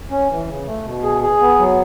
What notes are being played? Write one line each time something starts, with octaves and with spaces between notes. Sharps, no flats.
C#4
E3
C#3
A3
B2
G#4
G#4
B3
F#3